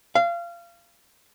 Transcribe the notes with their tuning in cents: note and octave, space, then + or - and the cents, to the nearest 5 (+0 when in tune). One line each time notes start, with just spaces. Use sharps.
F5 -25